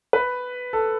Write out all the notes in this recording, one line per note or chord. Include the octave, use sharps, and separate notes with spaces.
B4
A4